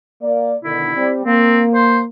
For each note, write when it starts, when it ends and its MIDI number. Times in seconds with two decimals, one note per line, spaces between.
0.22 0.54 58
0.22 0.54 74
0.64 0.93 47
0.64 0.93 50
0.64 0.93 51
0.64 1.07 64
0.95 1.23 55
0.95 1.23 60
1.25 2.06 58
1.25 1.61 60
1.75 1.99 72